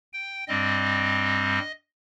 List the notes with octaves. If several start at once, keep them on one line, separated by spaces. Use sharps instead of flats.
G5
G2 G3 C4 D#5